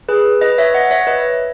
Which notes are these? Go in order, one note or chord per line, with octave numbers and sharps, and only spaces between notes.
G#4 B4
B4 D#5
C#5 E5
D#5 F#5
C#5 E5
B4 D#5